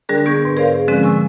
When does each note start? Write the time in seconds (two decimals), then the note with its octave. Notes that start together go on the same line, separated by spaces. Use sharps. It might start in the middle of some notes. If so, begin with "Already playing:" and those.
0.09 D3 G3 D4 G#4 A#4
0.26 G3 B3 C#6 G6 G#6
0.44 G#2 B4
0.57 G#4 A#4 C5 D5 F5
0.88 D3 F3 G#3 C4 C#4
1.03 G#5 C#6 E6